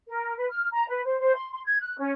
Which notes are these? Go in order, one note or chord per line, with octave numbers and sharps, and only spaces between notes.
A#4
B4
F6
A#5
B4
C5
C5
C6
C6
G#6
F#6
C#4